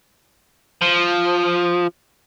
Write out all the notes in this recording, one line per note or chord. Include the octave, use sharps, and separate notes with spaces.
F3